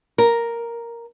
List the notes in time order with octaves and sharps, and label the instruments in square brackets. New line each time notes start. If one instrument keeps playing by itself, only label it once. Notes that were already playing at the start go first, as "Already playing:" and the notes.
[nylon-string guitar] A#4